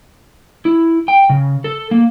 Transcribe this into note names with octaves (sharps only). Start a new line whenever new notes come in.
E4
G5
C#3
A4
A#3